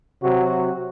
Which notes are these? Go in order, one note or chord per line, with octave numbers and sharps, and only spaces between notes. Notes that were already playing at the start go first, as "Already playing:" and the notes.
C3 F#3 F#4